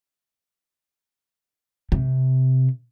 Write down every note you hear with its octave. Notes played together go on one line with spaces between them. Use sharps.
C3